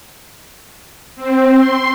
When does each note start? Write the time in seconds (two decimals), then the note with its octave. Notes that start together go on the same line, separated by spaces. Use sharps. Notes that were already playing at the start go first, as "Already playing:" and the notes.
1.16 C4
1.54 C6